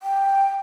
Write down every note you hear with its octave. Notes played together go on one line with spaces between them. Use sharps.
G5